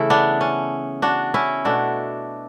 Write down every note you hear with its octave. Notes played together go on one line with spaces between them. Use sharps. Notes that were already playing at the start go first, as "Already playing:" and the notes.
Already playing: C#3 E3 A3 E4
B3 D4
C#4
D4 F#4
C#4 E4
B2 A3 D4 F#4